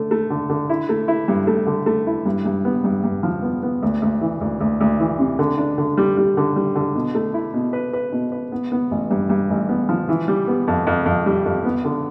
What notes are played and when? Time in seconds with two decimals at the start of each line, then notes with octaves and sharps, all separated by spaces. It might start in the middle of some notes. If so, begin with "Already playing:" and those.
Already playing: D3 A3
0.11 A3
0.30 D3
0.50 D3
0.70 E4
0.89 A3
1.08 E4
1.28 G2
1.47 A3
1.67 D3
1.86 A3
2.07 E4
2.26 G2
2.45 G2
2.65 B3
2.84 G2
3.04 G2
3.23 F3
3.43 B3
3.63 B3
3.83 D2
4.02 D2
4.21 E3
4.41 D2
4.60 D2
4.81 D2
4.99 E3
5.19 C3
5.39 D3
5.58 D4
5.78 D3
5.97 G3
6.17 G3
6.37 D3
6.56 G3
6.76 D3
6.96 B2
7.15 A3
7.34 E4
7.54 B2
7.73 B4
7.93 B4
8.13 B2
8.32 B4
8.52 B3
8.72 B3
8.91 A1
9.11 G2
9.29 G2
9.50 A1
9.69 B3
9.89 F3
10.09 E3
10.28 G3
10.48 B3
10.68 F2
10.87 F2
11.06 F2
11.26 G3
11.45 F2
11.65 B3
11.85 D3